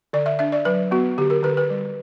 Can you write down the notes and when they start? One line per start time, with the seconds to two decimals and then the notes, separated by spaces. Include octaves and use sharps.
0.13 D3 D5
0.26 E5
0.39 D4 E5
0.52 D5
0.65 F#3 B4
0.91 B3 F#4
1.18 D3 G4
1.30 A#4
1.43 D3 B4
1.57 B4
1.70 G3